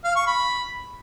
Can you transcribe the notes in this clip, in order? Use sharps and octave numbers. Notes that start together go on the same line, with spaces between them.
F5
C#6
B5